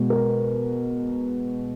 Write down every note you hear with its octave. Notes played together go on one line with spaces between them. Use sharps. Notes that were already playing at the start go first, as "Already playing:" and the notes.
Already playing: B2 G#3
A#4